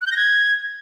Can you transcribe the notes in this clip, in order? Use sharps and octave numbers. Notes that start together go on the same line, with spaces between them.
F#6
G6
A#6
G#6